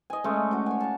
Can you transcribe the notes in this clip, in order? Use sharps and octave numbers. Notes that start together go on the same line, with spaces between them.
D#5 G#5
G#3 A3 C#4
F#4 D6
C#5 G#5
F5 A5